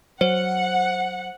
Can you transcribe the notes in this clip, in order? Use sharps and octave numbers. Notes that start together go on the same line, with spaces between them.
F#3 C5 F#5